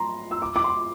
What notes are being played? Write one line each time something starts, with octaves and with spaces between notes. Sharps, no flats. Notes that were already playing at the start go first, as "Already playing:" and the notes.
Already playing: A#5 C6
E6
D6
D6
C6